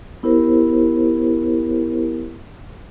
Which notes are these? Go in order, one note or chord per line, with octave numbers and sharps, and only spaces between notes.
B3 E4 G4 A#4 C5